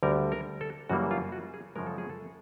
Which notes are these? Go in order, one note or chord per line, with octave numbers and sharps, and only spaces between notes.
D2 D3 G3 A#4
A#4
A4
F#2 C#3 E3 G3 A#3 F#4
F4
F#4
G#4
F#2 C#3 F3 G#3 A#4
A4
G#4
A4